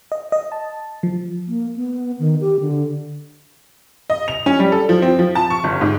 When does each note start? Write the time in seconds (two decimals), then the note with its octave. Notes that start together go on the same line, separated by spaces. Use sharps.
0.12 D#5
0.32 D#5
0.52 A5
1.03 F3
1.46 A#3
1.76 B3
2.19 D#3
2.41 G4
2.60 D3
4.10 D#5
4.28 F7
4.46 C#4
4.60 G3
4.72 A4
4.89 F3
5.02 C4
5.19 F3
5.35 A5
5.50 C#6
5.64 G1
5.81 G#2